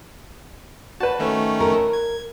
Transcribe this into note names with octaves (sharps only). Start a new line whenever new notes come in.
F#4 B4 A5
D#3 A3 C#4
A#4
G#6